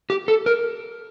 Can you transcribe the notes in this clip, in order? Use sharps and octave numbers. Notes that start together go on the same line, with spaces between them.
G4
A4
A#4